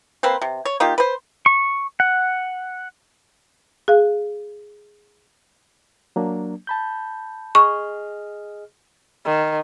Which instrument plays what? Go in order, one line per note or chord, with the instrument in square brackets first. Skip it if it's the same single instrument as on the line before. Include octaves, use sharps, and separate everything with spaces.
[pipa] A#3 C4 B4 C5
C3
C#5
A#3 D#4 F4 G4
B4 C5
[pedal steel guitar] C#6
F#5
[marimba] G#4 F5
[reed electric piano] F#3 A#3 D4
A5 B5 G6
[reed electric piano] G#4 D#5 F6 [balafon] C#6
[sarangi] D#3